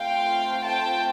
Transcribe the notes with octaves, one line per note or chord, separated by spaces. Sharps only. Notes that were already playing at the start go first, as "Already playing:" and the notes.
Already playing: A3 C4 F4 F5 G5
G5 A5